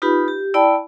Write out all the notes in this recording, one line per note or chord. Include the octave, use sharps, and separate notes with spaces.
D#4 F4 G4 B4 B5
G4
E4 D5 G5 A5 B5